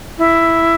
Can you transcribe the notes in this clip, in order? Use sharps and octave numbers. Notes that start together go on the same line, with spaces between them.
E4